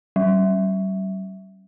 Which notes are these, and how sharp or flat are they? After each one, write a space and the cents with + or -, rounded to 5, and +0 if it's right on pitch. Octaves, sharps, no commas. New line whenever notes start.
G3 -35